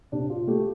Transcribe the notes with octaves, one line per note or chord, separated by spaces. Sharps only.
C3 D4
F4
A3 G4